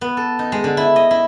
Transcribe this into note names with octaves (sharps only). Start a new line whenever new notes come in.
B3
A4
D#4
G#3
D3
E4
D#5
E4